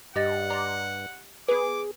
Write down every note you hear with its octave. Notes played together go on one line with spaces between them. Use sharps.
G2 G4 D#5 F#5 A6
D5 A#5 C6
B3 G#4 B4 D6